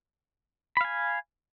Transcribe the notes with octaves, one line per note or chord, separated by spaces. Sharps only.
F5 G#5 B5